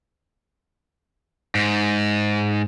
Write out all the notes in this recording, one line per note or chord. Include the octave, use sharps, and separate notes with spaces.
G#2